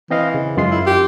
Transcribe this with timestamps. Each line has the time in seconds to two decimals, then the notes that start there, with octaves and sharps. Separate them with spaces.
0.11 E3 C4 D#5 F5
0.34 C#3
0.57 F#2 G#3 F4 C7
0.70 E4
0.86 G4